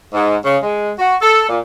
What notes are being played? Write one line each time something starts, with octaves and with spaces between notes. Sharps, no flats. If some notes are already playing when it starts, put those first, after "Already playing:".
G#2
C#3
G#3
F#4
A4
A#2